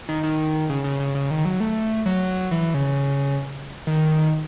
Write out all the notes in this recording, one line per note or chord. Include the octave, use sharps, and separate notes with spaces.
D#3
D#3
C#3
C#3
C#3
C#3
D#3
F#3
A3
F#3
E3
C#3
D#3